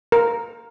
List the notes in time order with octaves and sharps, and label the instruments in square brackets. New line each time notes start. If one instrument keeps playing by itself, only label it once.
[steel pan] A#4